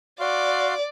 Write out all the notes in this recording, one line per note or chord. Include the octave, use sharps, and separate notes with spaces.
F#4 D5 F5 C6